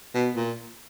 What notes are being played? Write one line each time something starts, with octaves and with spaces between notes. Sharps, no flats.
B2
A#2